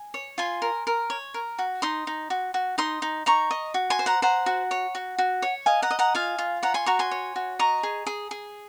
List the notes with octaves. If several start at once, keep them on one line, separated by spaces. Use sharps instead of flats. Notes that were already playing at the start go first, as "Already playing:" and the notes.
Already playing: G#5
C#5
F4 G#5 C6
A#4
A#4
C#5
A#4
F#4
D#4 C6 D#6
D#4
F#4
F#4
D#4 C6 D#6
D#4
D#4 A#5 C#6
D#5
F#4
G#5 C6
C5
F#5 A#5
C5 F#5 A#5
F#4
C#5
F#4
F#4
C#5
D#5 F5 G#5
F#5 A#5
D#5
F#5 A#5
F4 F5 G#5
F4
C#5 F#5 A#5
G#5 C6
F#4 A#5 C#6
G#5 C6
C#5
F#4
D#5 A#5 C#6
G#4
G#4
G#4